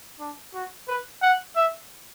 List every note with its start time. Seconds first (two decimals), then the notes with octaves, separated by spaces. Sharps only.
0.20 D4
0.54 F#4
0.88 B4
1.22 F#5
1.56 E5